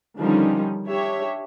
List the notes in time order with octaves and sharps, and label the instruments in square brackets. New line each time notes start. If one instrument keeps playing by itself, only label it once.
[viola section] D3 D#3 F3 G3 C#4 D#4
D4 G4 C#5 E5